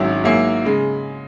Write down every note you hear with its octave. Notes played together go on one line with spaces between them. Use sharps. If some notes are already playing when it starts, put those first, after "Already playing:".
Already playing: G#1 G#2 F#3 C#4 E4
G#2 F#3 A#3 E4 G#4
C#3 G#3